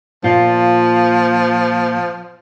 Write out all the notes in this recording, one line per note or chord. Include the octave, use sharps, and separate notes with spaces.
A#2 F3 F4